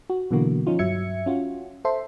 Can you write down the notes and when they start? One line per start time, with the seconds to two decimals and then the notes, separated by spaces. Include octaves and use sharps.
0.10 F#4
0.31 B2 D3 E3 F#3 A#3 F#4
0.67 F3 C#4 D#4 F4
0.79 G2 F#3 E5 G#6 C#7
1.26 C#4 F4 F#4
1.85 A4 C5 E5 C6